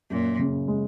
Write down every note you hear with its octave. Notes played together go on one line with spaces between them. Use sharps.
F#2 A#2
C#3
G#3